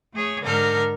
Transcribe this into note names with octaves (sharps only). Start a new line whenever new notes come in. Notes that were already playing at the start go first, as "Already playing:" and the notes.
A3 G#4 C#5
G#2 D3 A4 A#4 F6 G6